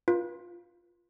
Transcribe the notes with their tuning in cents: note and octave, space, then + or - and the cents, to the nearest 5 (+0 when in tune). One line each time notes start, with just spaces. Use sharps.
F4 +0 B4 -35